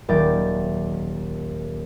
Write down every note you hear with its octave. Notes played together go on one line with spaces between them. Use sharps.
D#1 F#3 D#4 G5 D6 A6